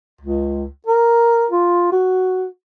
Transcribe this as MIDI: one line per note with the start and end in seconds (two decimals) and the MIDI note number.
0.21 0.66 37
0.86 1.46 70
1.50 1.91 65
1.92 2.46 66